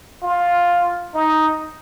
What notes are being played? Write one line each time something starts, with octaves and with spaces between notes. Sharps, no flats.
F4
D#4